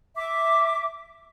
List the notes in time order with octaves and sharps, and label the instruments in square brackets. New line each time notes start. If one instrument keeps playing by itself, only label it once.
[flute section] E5 D6